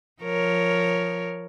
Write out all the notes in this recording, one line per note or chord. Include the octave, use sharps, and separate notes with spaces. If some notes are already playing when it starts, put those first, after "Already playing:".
F3 A#4 C#5